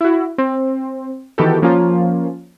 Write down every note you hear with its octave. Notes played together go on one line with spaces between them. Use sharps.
E4 F#4
C4
D#3 E3 B3 F#4 G4 A4
F3 A#3 C#4 F4